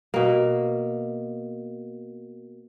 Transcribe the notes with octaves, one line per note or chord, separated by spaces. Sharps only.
B2 A#3